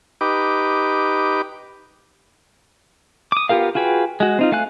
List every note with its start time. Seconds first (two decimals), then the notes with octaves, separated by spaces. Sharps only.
0.21 D#4 G4 B4 D6
3.32 D6 D#6
3.49 B3 F4 G4 A#4 F5
3.75 F4 F#4 G#4 B4 G5
4.20 G#3 F#4
4.39 C4 D#4 F4
4.52 A3 F5 G#5 F#6